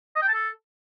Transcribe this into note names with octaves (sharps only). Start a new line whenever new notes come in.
D#5
G5
A5
A4